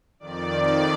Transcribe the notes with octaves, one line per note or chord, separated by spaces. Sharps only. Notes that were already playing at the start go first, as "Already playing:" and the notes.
F2 D#3 D5